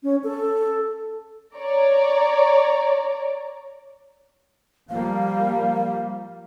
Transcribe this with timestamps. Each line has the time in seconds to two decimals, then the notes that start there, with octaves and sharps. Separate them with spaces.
0.03 C#4
0.24 A4
1.54 C#5 D5 A#5
4.89 F3 G3 A#3 F5